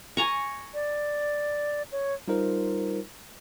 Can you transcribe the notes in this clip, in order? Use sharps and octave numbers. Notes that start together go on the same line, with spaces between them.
G#5 A#5 C#6
D5
C#5
G3 D#4 F4 A#4 C5